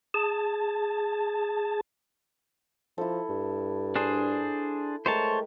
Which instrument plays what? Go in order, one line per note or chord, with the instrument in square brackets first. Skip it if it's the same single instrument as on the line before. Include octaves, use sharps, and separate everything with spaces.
[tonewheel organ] G#4 A5
[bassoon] F3 [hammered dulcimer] E4 A4
[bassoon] G2
[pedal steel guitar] D4 G#4 C5
[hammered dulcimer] G#3 G4 A#4 [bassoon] A3 [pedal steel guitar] C5 C#5 A5